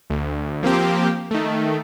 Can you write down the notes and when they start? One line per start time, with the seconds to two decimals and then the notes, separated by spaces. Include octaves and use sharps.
0.10 D2
0.63 F3 A#3 C4 G4
1.31 D#3 A3